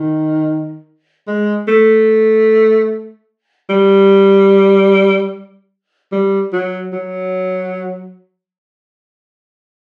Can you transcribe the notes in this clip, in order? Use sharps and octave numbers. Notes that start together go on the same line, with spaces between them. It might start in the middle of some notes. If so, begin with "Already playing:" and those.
Already playing: D#3
G#3
A3
G3
G3
F#3
F#3